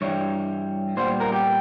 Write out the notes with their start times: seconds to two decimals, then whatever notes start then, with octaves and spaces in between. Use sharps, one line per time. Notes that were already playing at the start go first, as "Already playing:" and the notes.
0.01 G2 E3 G3 C#5
0.97 A#2 G3 B3 C5
1.20 A#4
1.32 G4